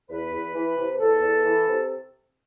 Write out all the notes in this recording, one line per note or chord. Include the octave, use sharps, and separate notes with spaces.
E2 B4
E2
E3
C3
E2 A4
E2
E3
C3